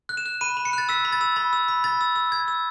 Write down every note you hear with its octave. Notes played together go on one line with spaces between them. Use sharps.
F#6
E7
F#6
B5 D#7
B5
C#7
F#6 A6
E6 B6
B5
A6
E6
B5 A6
E6
B5
B5 A6
E6
E6
E6 G#6
E6